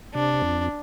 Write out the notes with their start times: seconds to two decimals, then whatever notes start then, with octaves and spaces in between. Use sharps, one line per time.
0.14 C3 D4
0.41 F2